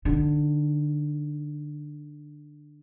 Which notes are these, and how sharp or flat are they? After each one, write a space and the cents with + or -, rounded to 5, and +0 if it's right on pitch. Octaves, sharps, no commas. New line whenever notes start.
D3 +15 D#4 +0